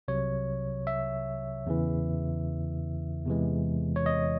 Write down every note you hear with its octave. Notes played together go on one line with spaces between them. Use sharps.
C2 C3 F#3 C#5
E5
E2 C#3 E3
E2 C3 E3 G#3
C#5
D#5